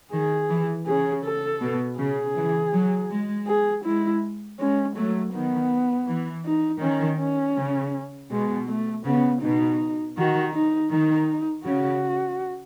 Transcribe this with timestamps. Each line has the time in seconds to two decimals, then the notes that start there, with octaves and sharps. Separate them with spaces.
0.12 D#3 G#4
0.49 E3
0.86 C#3 G#4
1.24 A4
1.61 B2
1.98 C#3 G#4
2.36 E3
2.73 F#3
3.10 G#3
3.47 G#4
3.84 G#3 E4
4.60 G#3 C#4
4.96 F#3 A3
5.34 D#3 B3
6.08 E3
6.45 D#4
6.82 D#3 C#4
7.19 C#4
7.57 C#3
8.31 B2 G#3
8.68 A3
9.05 C#3 B3
9.42 B2 D#4
10.17 D#3 F#4
10.53 D#4
10.91 D#3 D#4
11.65 C#3 F#4